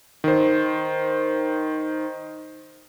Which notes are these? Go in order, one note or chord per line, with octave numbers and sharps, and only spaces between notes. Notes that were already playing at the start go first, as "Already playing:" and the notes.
D#3 C5